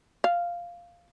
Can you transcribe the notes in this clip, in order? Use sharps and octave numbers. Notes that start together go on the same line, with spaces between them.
F5